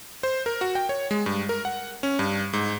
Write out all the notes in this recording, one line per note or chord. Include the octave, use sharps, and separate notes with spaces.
C5
A#4
F#4
G5
C#5
G#3
G2
A#4
F#5
C#4
G2
G#2